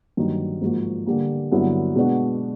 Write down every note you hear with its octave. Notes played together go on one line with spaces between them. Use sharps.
G2 D#3 F#3 A#3 D#4
G#2 F3 A#3 D#4 F#4
D3 G3 A#3
G2 D3 F#3 B3 E4
B2 G#3 B3 D4 F#4